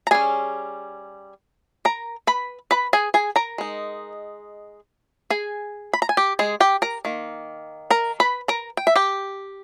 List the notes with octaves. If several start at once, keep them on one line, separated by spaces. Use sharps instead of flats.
A#5
G3 C#4 G#4 G#5
A#4 A#5
B4 B5
B4 B5
G#4 G#5
G#4 G#5
A#4 A#5
G#3 D#4
G#4 G#5
B5
A#5
G#5
G4 G5
G#3 G#4
G4 G5
A#4 A#5
D#3 A#3
A#4 A#5
B4 B5
A#4 A#5
G5
E5
G4 G5